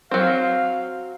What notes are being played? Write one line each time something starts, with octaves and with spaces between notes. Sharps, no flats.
F#3 C4 F5